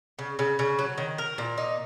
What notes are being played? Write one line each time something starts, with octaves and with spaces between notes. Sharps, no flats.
C#3
C#3
C#3
F#3
D#3
A#4
A#2
D#4